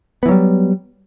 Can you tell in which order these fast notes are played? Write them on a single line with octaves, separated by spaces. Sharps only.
B3 E3 F#3 G3